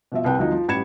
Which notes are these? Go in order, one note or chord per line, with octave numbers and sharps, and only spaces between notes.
B2 F3 E5
C2 B4 G5
D2 F3 D#4
F3
A1 G3 B5 G#6 C#7 E7